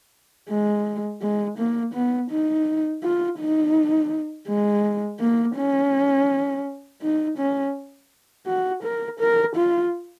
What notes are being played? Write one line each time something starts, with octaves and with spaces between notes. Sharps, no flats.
G#3
G#3
A#3
B3
D#4
F4
D#4
G#3
A#3
C#4
D#4
C#4
F#4
A#4
A#4
F4